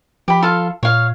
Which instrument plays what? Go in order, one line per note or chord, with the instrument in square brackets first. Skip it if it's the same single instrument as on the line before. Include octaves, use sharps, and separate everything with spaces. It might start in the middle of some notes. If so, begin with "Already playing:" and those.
[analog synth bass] F3 [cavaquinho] G4 B5
[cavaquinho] F4 A4 F5
[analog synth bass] A#2 [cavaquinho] C#5 F5